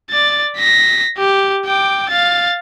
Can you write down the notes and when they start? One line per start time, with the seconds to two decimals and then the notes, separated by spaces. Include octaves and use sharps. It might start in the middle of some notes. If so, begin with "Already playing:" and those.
0.10 D5 A6
0.57 A#6 B6
1.18 G4
1.66 G5 D6
2.10 F5 A6